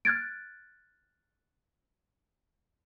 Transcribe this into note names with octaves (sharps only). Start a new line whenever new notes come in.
F6 F#6 G#6 A6 D7